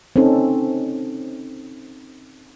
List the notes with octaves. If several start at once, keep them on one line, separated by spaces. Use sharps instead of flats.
C4 C#4 D#4 A4